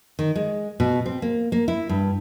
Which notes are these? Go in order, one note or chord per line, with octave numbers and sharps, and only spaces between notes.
D#3
G#3
B2
C4
A#3
A#3
E4
G2